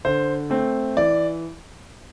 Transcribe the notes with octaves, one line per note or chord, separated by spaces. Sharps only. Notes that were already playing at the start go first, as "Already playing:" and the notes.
D3 C5
A3 C4
E3 D5